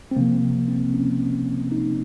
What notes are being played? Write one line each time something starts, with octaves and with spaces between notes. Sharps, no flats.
C4
C3 F3 A#3
C4
C#4
D#4